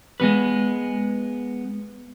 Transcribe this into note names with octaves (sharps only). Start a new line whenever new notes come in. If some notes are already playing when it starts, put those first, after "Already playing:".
G#3 B3 B4